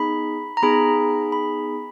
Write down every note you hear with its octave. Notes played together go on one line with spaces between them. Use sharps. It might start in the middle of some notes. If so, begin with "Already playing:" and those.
Already playing: B3 D#4 G#4 B5
A#5
B3 D#4 G#4 B5
B5